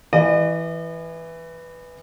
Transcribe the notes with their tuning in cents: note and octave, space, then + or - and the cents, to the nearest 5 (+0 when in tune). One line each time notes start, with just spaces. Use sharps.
E3 +0 D#5 -45